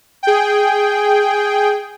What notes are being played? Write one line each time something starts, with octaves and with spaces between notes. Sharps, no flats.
G#4 G5